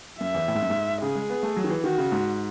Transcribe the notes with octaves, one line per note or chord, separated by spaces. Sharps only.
F#2 E5
E2
A2
G#2
F#2
G#2
C#3 G#4
G#3
B3
A3
F#3
D#3
E3
D#3 F#4
C#3
G#2